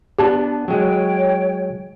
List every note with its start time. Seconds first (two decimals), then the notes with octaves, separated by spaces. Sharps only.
0.19 B3 D4 G4 A5
0.68 F#3 G#3 C#5 G5